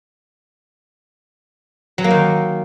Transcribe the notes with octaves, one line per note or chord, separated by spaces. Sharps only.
F#3
A#3
D#3